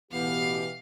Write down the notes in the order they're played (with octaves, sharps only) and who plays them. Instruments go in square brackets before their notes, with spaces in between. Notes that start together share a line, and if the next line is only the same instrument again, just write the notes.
[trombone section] A1 B3 [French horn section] B2 E3 [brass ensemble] G4 [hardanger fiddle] F5